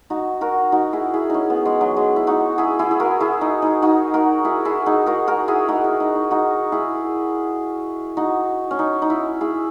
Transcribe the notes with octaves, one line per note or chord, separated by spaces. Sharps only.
D#4 F#4
F#4 A#4
D#4 F#4
E4 G#4
E4 G#4
C#4 D#4
B3
G#3
F#3
G#3
E4
D#4 F#4
E4 G#4
E4 G#4
G#4
F#4 A#4
E4 G#4
D#4
D#4
D#4 F#4
F#4 A#4
E4 G#4
E4 G#4
D#4 F#4
F#4 A#4
F#4 A#4
E4 G#4
D#4 F#4
E4
D#4
D#4
D#4 F#4
E4 G#4
D#4 F#4
C#4
D#4
D#4
E4
E4 G#4